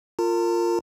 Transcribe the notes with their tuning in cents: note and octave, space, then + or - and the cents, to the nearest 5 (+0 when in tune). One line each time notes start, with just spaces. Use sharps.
F4 +0 A#4 -25 A#5 -45